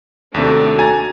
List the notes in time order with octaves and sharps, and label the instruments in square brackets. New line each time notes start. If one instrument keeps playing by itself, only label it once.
[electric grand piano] D#2 C3 [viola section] A3 D4 F#4
[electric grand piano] G#5 A#5 A6